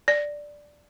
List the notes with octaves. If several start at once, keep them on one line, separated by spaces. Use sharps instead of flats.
D5